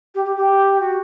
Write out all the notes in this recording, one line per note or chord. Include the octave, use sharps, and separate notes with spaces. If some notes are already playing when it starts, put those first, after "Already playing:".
G4
G4
G4
F#4